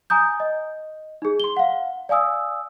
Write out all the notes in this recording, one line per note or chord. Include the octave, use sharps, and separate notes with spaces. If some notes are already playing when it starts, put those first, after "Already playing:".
G#5 A#5 D#6 G6
D#5
D#4 G#4
C6 G7
F5 F#5
D5 F5 G#5 D#6 E6